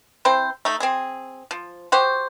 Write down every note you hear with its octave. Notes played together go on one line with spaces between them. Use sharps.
C4 E4 C5
A3 D#4
C4 G#4
F3
F#4 G4 C5